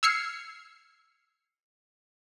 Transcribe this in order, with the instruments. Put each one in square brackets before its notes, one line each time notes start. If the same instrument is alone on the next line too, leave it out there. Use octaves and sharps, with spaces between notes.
[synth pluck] E6 F6 G#6 C7 C#7